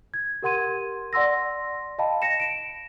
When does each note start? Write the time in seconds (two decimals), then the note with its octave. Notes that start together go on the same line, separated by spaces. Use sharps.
0.14 G#6
0.43 G4 A#4 F#5 C6 G#6 D#7
1.13 D5 F#5 C6 E6 A#6
1.99 D#5 F5 G5 A5 B5
2.22 A#6 C#7 E7
2.40 D7 E7